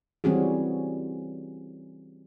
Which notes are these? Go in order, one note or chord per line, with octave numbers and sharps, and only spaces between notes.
E3 G3 C4 C#4 F#4 G#4